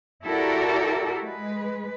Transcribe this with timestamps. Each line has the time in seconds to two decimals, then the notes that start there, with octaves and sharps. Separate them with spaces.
0.24 E4 F#4 G4 A4 A#4 D5
1.23 G#3 B4